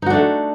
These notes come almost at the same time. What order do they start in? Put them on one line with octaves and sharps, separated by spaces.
D#4 F#4 D4 A3